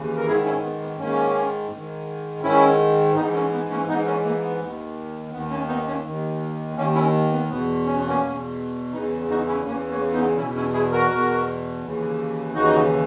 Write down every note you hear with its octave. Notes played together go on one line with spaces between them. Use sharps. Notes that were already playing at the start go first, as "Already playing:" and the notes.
Already playing: D#2 C#3 E3
A#4
G#2 D#3 E4 G#4
C#4 E4
B3
B3
G#2 D#3 A#3 C#4
G#2 D#3
G#2 D#3 C#4 E4
G#2 E3 B3 D#4
A#3 C#4
B3
A#3 C#4
G#2 E3 B3 D#4
A#3 C#4
A#3
B3
D#2 D#3
D#2 D#3 B3
A#3 C#4
B3 D#4
A#3 C#4
D#2 D#3
D#2 D#3 A#3 C#4
C#4 E4
B3
E2 B2 B3
C#4
B3
A#3 C#4
E2 B2
E2 C#3 E3 B3 D#4
D#4 F#4
C#4 E4
E2 C#3 E3 A#3 C#4
A#3 C#4
B3 D#4
E2 B2 C#4 E4
C#4 E4
E4 G#4
F#4 A#4
E2 B2
D#2 C#3 E3
D#2 C#3 E3 D#4 F#4